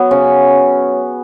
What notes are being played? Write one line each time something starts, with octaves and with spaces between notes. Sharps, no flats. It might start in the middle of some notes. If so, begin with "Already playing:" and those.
Already playing: F#3 B3
C#3 C#4